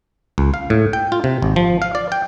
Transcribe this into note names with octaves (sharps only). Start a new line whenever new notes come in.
C#2
F5
A2
G5
F4
C3
G#1
F3
F5
D5
G5